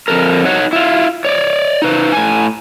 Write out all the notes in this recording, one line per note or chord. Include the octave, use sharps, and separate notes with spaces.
F2 E3 A4 A#4
D#4 C#5 F#5
E4 F4
C#5 D5
D#4 B4 C5
A2 G#5